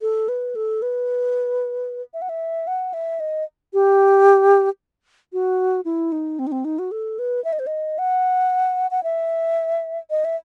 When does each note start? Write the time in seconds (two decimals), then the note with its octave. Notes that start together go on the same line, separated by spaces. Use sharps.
0.02 A4
0.29 B4
0.55 A4
0.82 B4
2.14 E5
2.22 F#5
2.29 E5
2.67 F#5
2.94 E5
3.20 D#5
3.74 G4
5.33 F#4
5.85 E4
6.12 D#4
6.39 C4
6.47 D#4
6.52 C4
6.65 D#4
6.79 F#4
6.91 A4
7.19 B4
7.44 E5
7.53 D#5
7.59 C5
7.67 D#5
7.98 F#5
8.91 F#5
9.03 E5
10.10 D#5
10.25 E5